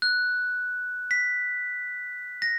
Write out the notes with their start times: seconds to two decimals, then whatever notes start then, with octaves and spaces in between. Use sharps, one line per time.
0.02 F#6
1.11 B6
2.42 A#6